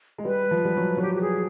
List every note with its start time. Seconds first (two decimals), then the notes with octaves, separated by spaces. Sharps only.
0.18 G#3
0.25 G3 B4
0.51 F3
0.65 G3
0.77 F#3
0.97 F#3
1.02 G3 G4
1.16 G4
1.21 G#4